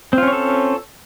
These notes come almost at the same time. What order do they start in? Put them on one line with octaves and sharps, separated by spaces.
C4 F4 C#4 C#5 A4